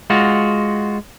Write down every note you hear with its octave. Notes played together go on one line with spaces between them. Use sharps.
G#3 F4 F#4